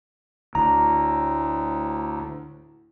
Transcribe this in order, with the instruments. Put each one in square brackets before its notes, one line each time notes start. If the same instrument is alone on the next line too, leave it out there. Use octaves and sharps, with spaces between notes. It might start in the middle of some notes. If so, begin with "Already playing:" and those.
[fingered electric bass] D2 [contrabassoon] A2 [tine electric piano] A#5